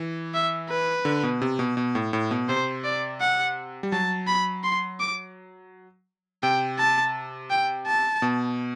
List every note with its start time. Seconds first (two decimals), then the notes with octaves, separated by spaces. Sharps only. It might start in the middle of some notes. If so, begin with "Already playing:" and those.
Already playing: E3
0.34 E5
0.69 B4
1.05 D3
1.23 B2
1.42 C3
1.59 B2
1.77 B2
1.95 A2
2.13 A2
2.31 B2
2.49 C3 C5
2.84 D5
3.21 F#5
3.83 G3
3.92 F#3 A5
4.27 B5
4.64 C6
5.00 D6
6.43 C3 G5
6.79 A5
7.50 G5
7.87 A5
8.22 B2